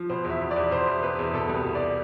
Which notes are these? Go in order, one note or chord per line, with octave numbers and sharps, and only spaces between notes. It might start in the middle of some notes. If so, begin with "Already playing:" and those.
Already playing: F3
B2 C5
E2
E5
B2
D5
E2
B2 C5
E2
B2 B4
E2
B2 A4
C2 B4
B2
D5